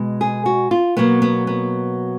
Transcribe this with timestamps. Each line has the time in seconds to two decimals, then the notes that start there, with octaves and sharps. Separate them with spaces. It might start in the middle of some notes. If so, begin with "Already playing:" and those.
Already playing: B2 G#3
0.21 G#4
0.46 F#4
0.71 F4
0.97 B2 F#3 A#3 B3
1.22 B3
1.47 B3